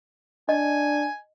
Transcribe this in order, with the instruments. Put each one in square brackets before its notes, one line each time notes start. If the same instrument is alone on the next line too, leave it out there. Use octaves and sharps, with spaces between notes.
[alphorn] D4 [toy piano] D#5 [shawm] G#5